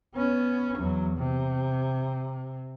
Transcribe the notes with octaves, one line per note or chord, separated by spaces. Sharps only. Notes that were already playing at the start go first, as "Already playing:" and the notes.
B3 C#4
E2 F#3
C3